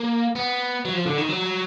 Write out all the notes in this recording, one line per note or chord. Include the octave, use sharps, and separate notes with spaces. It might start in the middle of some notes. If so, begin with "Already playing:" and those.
Already playing: A#3
B3
F#3
F3
D3
D#3
F#3